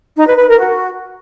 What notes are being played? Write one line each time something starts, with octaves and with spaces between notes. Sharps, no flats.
D#4
B4
B4
A#4
F#4